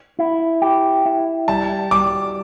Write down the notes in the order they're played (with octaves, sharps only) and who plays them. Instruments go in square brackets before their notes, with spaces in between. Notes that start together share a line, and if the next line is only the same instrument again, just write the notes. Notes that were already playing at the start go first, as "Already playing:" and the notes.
[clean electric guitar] E4
G4
E4
[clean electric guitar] G3 [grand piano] A5
[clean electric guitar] G3 [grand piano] D6